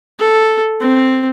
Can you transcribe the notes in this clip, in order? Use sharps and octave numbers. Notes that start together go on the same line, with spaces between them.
A4
C4